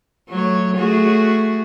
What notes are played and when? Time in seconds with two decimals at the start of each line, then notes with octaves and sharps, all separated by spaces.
0.29 F#3 A3 C#5
0.76 A3 F#4 G#4